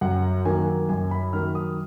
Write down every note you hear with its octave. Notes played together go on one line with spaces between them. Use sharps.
F#2 F#5
D#3 F#3 A#3 G#5
F#2 G#5
B5
D#3 F#3 A#3 F6
D#6